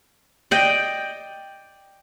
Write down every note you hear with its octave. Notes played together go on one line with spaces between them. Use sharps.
D5 D#5 G5